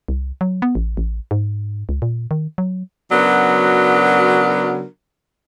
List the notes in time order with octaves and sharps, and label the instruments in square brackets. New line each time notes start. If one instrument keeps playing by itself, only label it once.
[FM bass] C2
F#3
B3
A1
A1
G#2
C#2
A#2
D#3
F#3
[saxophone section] C#3 F#3 B3 D4 F#4 A#4